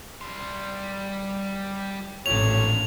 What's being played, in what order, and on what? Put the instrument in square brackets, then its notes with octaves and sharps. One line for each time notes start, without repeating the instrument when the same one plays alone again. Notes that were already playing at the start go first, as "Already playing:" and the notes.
[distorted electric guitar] G3 C6
[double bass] A1 A#2 [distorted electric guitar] F2 D4 [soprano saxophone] C#5 [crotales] F7